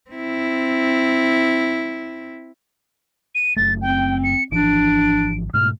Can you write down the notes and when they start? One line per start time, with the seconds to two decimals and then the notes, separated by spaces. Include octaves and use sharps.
0.11 C4 E4
3.35 D#7
3.56 F#1 A3 A6
3.81 C4 G5
4.24 C#7
4.52 G#1 E3 F3 D4 D7
5.54 G#2 B2 A3 F6